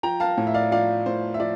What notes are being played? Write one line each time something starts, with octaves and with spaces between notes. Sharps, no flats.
F3 G5 A#5
F5 A5
A2
E5
D5 F5
F3 D5 F5
A2 C5
E5
F3 D5